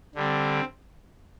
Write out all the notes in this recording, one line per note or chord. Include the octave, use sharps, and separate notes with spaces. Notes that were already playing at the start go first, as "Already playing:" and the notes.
D3 G3 C4